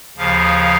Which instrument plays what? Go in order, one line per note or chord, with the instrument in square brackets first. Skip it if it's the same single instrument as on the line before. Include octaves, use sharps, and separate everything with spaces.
[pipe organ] D#2 C#3 F3 F5